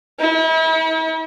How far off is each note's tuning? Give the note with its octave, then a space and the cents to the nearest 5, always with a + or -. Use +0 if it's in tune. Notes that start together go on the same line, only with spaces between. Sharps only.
E4 -40